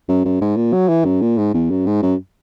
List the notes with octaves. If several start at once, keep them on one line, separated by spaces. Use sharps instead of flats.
F#2
F#2
G#2
A#2
F#3
E3
F#2
A#2
G#2
E2
F#2
G#2
F#2